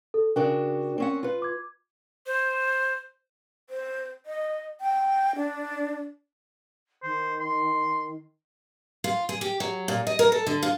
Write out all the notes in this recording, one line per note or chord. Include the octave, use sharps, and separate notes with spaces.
A4
C#3 D4 F#4 A#4 G5
C4 C#4 F#5
F4 B4
D6 G#6
C5
C5
D#5
G5
D4
D#3 C5
C6
F4
G#4
G4
F#3
A#2
D#5
A#4
A4
D3
F4